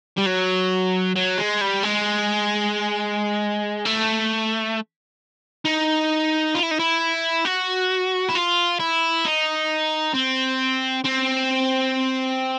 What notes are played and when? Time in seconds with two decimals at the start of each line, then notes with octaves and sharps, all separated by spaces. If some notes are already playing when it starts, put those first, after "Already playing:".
0.17 G3
0.26 F#3
1.16 F#3
1.38 G#3
1.61 G3
1.83 G#3
3.85 A3
5.65 D#4
6.55 F4
6.63 E4
6.71 D#4
6.79 E4
7.45 F#4
8.29 E4
8.35 F4
8.80 E4
9.25 D#4
10.15 C4
11.04 C4